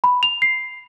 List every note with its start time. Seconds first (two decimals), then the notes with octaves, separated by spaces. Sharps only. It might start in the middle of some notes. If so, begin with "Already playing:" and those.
0.04 B5
0.23 F7
0.42 C7